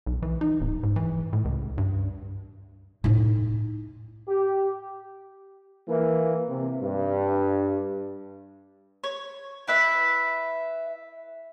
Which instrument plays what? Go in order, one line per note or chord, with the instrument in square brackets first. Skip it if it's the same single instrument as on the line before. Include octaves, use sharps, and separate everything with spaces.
[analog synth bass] B1
E3
D#4
D1
G#2
E3
A2
C#2
G2
[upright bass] A2 D#4
[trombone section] G4
E3 A#3
C3
G2
[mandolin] C#5
E4 B4 E5